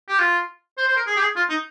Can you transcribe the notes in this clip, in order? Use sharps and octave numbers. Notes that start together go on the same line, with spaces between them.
G4
F4
C5
C5
A#4
G#4
G4
G#4
F4
D#4